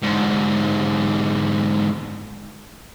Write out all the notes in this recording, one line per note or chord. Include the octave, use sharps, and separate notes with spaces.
G#2 D3